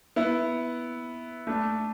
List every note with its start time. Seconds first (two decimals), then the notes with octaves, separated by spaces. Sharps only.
0.16 B3 E4
1.47 A3 D4